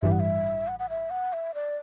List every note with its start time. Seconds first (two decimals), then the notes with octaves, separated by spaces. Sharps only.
0.02 A1 G2 E3 G3 E5
0.12 F#5
0.20 E5
0.68 F#5
0.79 F#5
0.90 E5
1.10 F#5
1.33 E5
1.54 D5